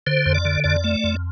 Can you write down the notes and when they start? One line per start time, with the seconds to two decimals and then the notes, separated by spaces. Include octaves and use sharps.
0.07 D3 C5
0.26 F2
0.35 D5
0.45 D3
0.64 F2 D5
0.84 A3
1.04 F2